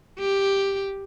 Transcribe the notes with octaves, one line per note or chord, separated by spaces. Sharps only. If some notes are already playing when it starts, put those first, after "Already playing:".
G4